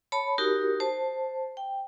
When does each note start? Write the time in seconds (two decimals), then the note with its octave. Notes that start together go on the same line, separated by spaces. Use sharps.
0.12 C#5 A5 B5
0.38 D#4 F#4 G4 A#4
0.80 C5 A5
1.57 G5